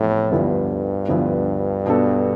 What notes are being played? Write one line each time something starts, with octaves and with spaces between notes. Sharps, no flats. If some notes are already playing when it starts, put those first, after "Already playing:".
Already playing: F2 A2 C3 E3 B3
D2 G2 D3 F3 B3 E4
D2 D3 F3 B3 E4
B2 B3 D4 A4